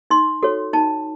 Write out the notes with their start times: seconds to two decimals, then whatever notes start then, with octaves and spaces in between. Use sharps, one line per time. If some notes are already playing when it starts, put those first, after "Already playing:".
0.10 D#4 C6
0.43 F#4 A4 C#5
0.73 D#4 A5